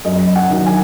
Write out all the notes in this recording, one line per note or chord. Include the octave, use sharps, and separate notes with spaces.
F#2 D#5
F#5
D#3 F#3
G#5